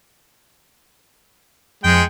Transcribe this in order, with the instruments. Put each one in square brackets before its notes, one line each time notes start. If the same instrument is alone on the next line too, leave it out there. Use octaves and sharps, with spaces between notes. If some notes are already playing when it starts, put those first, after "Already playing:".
[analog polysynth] F2 F3 C#7 [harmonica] G#3 G5